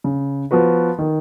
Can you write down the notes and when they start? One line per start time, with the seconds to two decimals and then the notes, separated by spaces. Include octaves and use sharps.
0.04 C#3
0.51 F3 B3 F#4 B4
0.98 D#3